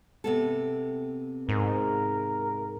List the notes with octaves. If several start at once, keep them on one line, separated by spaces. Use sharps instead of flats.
C3 B3 A4
G#2 A#4